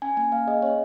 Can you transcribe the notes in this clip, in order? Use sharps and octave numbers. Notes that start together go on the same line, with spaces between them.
C#4 G#5
A#3 G#5
A#3 F5
G#4 D#5
C#4 C#5